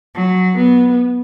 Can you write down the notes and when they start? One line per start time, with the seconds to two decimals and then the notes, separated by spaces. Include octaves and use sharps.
0.14 F#3
0.55 B3